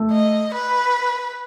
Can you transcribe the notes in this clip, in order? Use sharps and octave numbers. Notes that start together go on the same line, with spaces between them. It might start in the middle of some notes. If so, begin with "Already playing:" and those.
Already playing: A3
D#5
B4